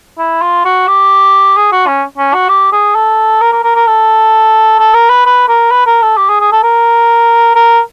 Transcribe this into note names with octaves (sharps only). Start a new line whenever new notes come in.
E4
F4
F#4
G4
G#4
F#4
C#4
C#4
F#4
G4
G#4
A4
A#4
A#4
A#4
A#4
A4
A4
A#4
B4
B4
A#4
B4
A#4
A4
G4
G#4
G#4
A4
A#4
A#4